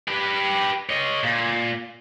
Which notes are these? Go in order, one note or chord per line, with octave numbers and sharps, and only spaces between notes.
G4 B4
C#5 D#5
A#2